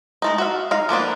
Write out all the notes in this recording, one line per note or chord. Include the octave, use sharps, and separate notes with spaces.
G#3 A3 D#4
F#4 E5 F5
D#4 F5
F3 A#3 B3 D4